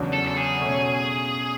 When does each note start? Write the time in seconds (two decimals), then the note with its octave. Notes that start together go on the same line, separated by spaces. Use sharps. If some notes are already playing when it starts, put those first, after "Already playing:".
Already playing: E2 C#3 F#3 B3 D4
0.13 A4
0.27 A4
0.37 G#4
0.60 B2 A3 C#4